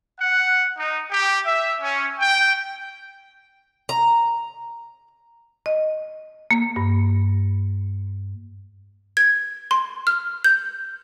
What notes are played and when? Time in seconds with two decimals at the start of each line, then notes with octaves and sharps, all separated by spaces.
0.18 F#5
0.76 D#4
1.10 G4
1.43 E5
1.80 C#4
2.19 G5
3.89 A#5
5.66 D#5
6.51 A#3
6.76 G2
9.17 G#6
9.71 C6
10.07 F6
10.44 G6